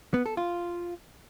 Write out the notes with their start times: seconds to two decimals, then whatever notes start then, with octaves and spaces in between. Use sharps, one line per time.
0.14 B3
0.26 A4
0.37 F4